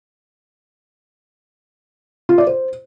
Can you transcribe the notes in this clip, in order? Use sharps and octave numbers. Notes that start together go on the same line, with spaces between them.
F4
D5
C5